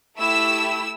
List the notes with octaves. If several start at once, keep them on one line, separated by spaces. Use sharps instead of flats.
A3 E4 G4 E6